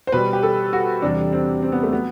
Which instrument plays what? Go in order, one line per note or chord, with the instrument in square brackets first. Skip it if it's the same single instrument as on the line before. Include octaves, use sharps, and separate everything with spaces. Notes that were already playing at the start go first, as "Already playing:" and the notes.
[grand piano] C5
B2 G3 B4
G4
A4
F#4
E2 C3 G3 D4
C4
C4
B3
A3
F#3 B3